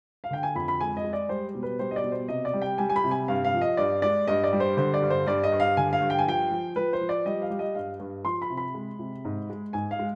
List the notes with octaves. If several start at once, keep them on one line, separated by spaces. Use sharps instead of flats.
F5
D3 G5
G#5
F2 B5
B5
G#3 G#5
D#5
G#3
D5
G3 C5
B2
B4
G3 C5
D#5
D5
B2
C5
C3 D#5
D5
G3
G5
G3 G#5
G#5
B5
C3
G#5
G2 F5
F5
F3
D#5
G2 D5
G#3 D5
G2 D#5
D5
G3
C5
D3 C5
D5
G2
C5
G2 D5
D#5
G2
F5
D3 G#5
F5
G2
G5
G#5
F3 G5
F3
F3 B4
C5
F3
D5
G3 D#5
F5
G3
D#5
G2 F5
G2
F3 C6
B5
C3
B5
G#3
C3
G#2
G#3
G#2 G#5
F5
G#3